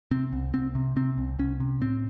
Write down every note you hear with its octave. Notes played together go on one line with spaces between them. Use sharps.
C3 C4
C2
C2 C4
C3
C3 C4
C2
C2 C#4
C3
A2 C4